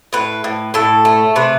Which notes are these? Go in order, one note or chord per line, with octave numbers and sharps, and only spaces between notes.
A2 B4
A2
A2 A4
A3
C3 B4